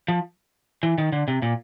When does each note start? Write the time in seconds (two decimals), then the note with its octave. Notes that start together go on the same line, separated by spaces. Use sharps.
0.08 F3
0.83 E3
0.98 D#3
1.12 D3
1.28 C3
1.42 A#2